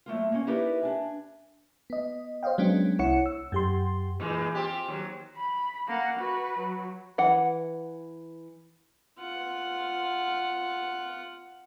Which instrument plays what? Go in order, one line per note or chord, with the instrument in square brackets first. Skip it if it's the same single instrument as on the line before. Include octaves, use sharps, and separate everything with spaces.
[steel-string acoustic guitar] F#3 A3 A#3 F4
A#3 C#4
D#4 E4 G4 A#4 B4 D5
D4 G#5
[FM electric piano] B3 D#5
C5 C#5 D#5 F5 G5
F#3 G#3 B3 C#4 D4
C2 E4 C#5 F#5 C#7
E6
F#2 G4 C6
[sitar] A#2 E3 G#3
C4 F4 G4
D#2 F#3
[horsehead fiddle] B5
A#3 F#5
F#4 B4
F#3
[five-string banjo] E3 F#5
[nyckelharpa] F4 F#5